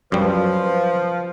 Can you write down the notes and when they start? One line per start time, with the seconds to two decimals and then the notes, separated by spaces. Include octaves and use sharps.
0.12 F#2 F3 G3 B4